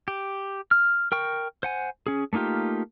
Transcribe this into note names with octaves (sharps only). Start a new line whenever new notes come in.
G4
F6
A#4 G5 C#6
C5 F#5 G#5
C#4 G#4
A3 A#3 D#4 F4 G4